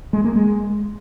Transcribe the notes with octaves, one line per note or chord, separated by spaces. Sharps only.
G#3
A#3
G#3